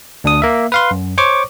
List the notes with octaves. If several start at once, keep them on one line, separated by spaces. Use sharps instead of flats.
D2 D4 D#6
A#3 E5
B4 F5 C6
F#2
C5 C#5 C#6 D6